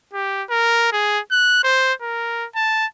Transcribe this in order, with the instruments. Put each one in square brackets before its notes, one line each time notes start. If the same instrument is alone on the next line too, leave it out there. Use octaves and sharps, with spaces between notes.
[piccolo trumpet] G4
A#4
G#4
F#6
C5
A#4
A5